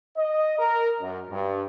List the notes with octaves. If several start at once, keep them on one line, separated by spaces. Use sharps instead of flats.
D#5
A#4
F#2
G2